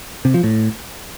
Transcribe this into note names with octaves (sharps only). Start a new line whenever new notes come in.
C3
F3
A2